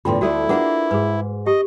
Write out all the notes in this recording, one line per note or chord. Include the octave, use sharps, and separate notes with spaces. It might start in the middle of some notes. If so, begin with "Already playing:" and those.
E2 A2 D3 F4 G5 C6
D2 A3 E4 F#4 A4 D5
A#3 D4 F4 G#4 B4 F#5
G#2 G#4 B4
G4 D#5